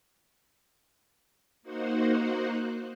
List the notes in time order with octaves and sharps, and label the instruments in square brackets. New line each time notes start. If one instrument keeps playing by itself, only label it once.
[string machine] A#3 D#4 F#4 C5 F#5